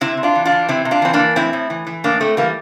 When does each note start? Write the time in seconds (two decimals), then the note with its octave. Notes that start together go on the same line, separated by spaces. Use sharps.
0.01 C3 C4 E4
0.17 C3
0.23 D4 F4
0.35 E3
0.45 D4 F4
0.52 E3
0.69 C3 C4 E4
0.85 C3
0.91 D4 F4
1.02 E3 C4
1.13 A#3 D4
1.19 E3
1.36 A2 C4 E4
1.53 A2
1.70 E3
1.87 E3
2.04 A2 A#3 D4
2.20 A2 A3 C4
2.37 E3 G3 A#3